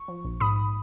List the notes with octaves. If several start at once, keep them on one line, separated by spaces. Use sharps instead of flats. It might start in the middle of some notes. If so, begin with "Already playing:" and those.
Already playing: C#6
F3
A#1
G#2 B5 D#6